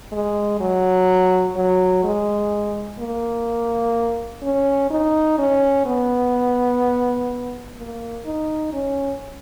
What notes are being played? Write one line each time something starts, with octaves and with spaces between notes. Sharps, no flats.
G#3
F#3
F#3
G#3
A#3
C#4
D#4
C#4
B3
A#3
D#4
C#4